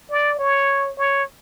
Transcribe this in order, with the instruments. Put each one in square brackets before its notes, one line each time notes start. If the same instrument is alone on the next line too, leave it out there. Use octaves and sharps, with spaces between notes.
[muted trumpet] D5
C#5
C#5